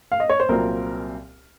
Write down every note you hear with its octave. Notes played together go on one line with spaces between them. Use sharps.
F5
D#5
C#5
C5
C2 A#2 F#3 C4 F4 A#4